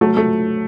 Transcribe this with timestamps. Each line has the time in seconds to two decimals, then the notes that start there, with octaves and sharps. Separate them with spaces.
0.01 F#3 A3
0.17 A3